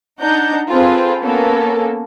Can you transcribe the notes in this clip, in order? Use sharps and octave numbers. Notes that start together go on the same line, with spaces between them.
D4 D#4 F#5 A#5 G6
C4 F4 G#4 A4 B4 G5
A#3 B3 C#4 A4 A#4